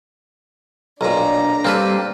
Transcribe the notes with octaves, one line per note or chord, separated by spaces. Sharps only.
B1 A#2 D4 A#5
G3 A#3 C4 A4 B4